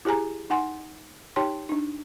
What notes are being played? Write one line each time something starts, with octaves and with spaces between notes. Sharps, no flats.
E4 G4 G#4 G#5 A#5
D#4 F#5 G#5 C6
D#4 G4 C#5 G5 A5 C6
D4 D#4